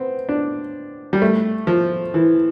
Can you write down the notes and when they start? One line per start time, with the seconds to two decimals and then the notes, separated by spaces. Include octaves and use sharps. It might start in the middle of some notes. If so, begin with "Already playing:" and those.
Already playing: B3 C4
0.29 D4
1.13 G3
1.22 A3
1.67 F3
2.14 E3